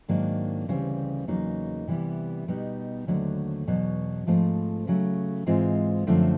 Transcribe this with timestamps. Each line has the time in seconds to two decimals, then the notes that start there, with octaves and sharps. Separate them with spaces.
0.08 G#2 D#3 F#3 A#3 D4
0.68 D2 C#3 E3 G3 C4
1.28 E2 C#3 F#3 A#3 D#4
1.87 C3 E3 G3 B3 E4
2.48 B2 G3 B3 D#4
3.07 D#2 D3 F#3 A3 C4
3.67 E2 B2 F#3
4.27 G#2 F3 A3 C4
4.87 C#3 F#3 A3
5.46 G#2 E3 G#3 C4 F4
6.07 F#2 D3 F3 A3 C4